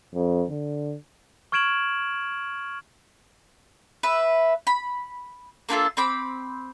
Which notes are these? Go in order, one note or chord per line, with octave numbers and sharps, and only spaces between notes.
F2
D3
C#6 F6 G#6 D7 E7 F#7
B4 E5
B5
A#3 D4 F4 A4
C4 B5 D6